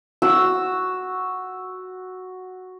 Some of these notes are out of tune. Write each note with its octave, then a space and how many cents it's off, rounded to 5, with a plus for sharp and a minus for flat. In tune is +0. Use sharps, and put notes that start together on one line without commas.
F#4 +0 E6 +0